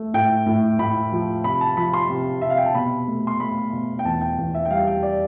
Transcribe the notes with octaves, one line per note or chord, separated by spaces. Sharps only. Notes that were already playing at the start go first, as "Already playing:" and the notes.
Already playing: A3
A2 G5
A2
A2 B5
F3
C3 B5
A5
F3 B5
C6
C3
C3 E5
F5
G5
A5
B2 B5
A3
C6
A3 B5
B2
G5
E2 A5
G5
E2
E5
G5
G3 F5
G5
D5